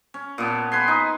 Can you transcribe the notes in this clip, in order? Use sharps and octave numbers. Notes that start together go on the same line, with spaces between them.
C#4
A#2 B3 A5
B4 G#5 C6
D#4